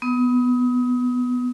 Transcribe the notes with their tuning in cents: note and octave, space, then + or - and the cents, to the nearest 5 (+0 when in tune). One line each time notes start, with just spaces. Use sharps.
B3 +0 D#6 +30